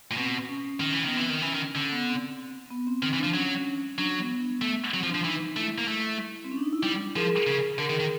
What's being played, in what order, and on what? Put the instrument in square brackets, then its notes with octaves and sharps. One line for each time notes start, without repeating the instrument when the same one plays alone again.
[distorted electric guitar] A#2
[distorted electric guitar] B2 [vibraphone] C4
[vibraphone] C#4
[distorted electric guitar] D#3
E3
[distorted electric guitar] D#3 [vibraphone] B3
[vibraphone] C4
[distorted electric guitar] E3
D#3
[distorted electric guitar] E3 [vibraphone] C#4
[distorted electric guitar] D#3
[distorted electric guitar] D3 [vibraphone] C#4
[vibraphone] B3
C4
B3
C4
[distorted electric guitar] D#3 [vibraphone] C4
[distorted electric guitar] E3
[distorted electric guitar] F3 [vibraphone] D4
[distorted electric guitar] F#3 [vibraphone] C#4
[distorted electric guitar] F#3 [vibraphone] D4
[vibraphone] B3
[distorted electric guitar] A3
[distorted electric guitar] F#3 [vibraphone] C4
[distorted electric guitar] F3
[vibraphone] D4
[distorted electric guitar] F3
[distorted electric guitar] E3 [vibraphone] D#4
[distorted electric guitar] A3 [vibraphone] E4
[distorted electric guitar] A#3
A3
[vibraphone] C4
C#4
D4
D#4
E4
[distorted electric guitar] G3
[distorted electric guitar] F3 [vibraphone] G#4 A#4
[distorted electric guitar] C#3
[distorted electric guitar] D3 [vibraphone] G#4 A#4
[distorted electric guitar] D#3
D#3